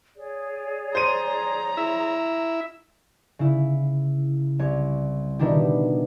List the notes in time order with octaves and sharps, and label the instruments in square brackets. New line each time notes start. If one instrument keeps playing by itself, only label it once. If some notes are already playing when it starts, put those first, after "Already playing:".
[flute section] G#4 C#5 D5
[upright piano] C5 D#7 [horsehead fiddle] A#5
[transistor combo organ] E4 E5
[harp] C#3 E4
C2 C#5
B2 D#3 D4 E4 G4